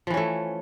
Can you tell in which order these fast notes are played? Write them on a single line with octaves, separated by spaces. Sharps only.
F3 E3 C#4 A3